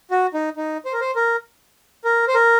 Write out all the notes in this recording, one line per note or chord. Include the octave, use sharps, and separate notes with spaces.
F#4
D#4
D#4
C5
A#4
C5
A#4
A#4
C5
A#4